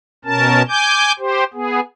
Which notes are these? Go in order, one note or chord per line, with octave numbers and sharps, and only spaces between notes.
B2 C#4 A#4 A5
G#5 D6 G6
G4 C5
B3 G#4